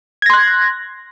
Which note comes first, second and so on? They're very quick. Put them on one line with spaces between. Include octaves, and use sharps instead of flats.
G#6 A#6 C6 F#6